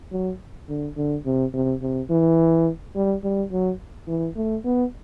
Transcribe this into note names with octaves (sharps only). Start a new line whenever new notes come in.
F#3
D3
D3
C3
C3
C3
E3
G3
G3
F#3
E3
A3
B3